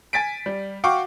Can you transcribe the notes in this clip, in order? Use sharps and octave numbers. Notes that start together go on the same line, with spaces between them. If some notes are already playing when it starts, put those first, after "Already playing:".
G#5 A6 B6 D7
G3
F#4 F5 G5 C#6 D6